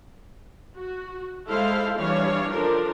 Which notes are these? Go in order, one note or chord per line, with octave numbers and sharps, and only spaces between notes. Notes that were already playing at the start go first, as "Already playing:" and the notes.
F#4
G#3 E4 A4 C5 F5
E3 G3 D4 C#5 F5
F3 D4 A4 A#4